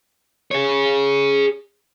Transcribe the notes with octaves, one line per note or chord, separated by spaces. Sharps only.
G#4 C#5